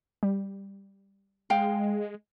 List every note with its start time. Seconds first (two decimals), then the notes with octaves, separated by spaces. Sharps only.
0.23 G3
1.50 G#3 F5 G5